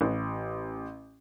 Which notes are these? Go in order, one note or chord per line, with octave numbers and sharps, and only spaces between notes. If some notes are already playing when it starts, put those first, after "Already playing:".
A1